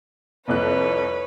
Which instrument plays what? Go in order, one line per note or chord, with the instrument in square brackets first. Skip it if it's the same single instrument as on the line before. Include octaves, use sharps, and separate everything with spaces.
[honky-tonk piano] C2 F2 F#6 [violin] B4 C#5